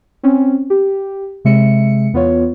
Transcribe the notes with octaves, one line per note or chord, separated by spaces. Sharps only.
C4 C#4
G4
C3 G#3 E5 C#7
E2 B3 F4 C#5